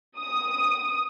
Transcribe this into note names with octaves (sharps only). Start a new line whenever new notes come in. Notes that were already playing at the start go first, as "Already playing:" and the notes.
D#6